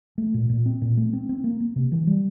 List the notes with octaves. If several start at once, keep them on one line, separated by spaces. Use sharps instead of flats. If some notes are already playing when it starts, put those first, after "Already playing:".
A3
A#2
A#2
C4
A#2
A3
C4
C4
A#3
A#3
C3
E3
G3